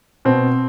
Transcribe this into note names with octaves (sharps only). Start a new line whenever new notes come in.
B2 C4